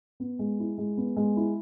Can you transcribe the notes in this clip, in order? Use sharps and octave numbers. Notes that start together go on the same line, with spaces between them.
B3
G#3
E4
G#3
B3
G#3
E4